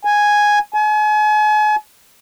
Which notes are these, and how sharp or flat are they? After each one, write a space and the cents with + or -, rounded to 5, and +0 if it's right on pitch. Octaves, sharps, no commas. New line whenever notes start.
G#5 +0
G#5 +40